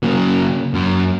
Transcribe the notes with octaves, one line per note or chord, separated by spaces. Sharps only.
C#3 F#3 A#3
F#2